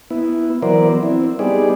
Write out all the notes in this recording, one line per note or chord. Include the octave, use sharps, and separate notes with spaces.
B3 E4
E3 F#3 B3 A#4 C5 D5
C4 E4
G3 B3 D#4 G#4 D5